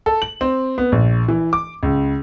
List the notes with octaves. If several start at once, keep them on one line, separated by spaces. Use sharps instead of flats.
A4
F#7
C4
B3
A#1
E3
D6
C#2